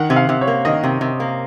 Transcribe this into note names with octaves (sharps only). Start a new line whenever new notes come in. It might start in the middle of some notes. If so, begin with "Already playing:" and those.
Already playing: D#3 F#5
C3
F5
C3
C#5
A#3
D#3 D#5
C3
C3
A#3